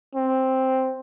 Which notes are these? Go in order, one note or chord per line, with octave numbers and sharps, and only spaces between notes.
C4